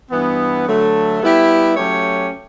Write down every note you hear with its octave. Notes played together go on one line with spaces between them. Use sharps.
G2 E3 B3
D3 F#3 A3
G3 B3 E4 G4
F#3 A3 C#4 G4 C#5